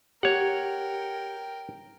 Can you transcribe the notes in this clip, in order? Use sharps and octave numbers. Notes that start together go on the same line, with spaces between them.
G4 A#4 C#5 F#5 G5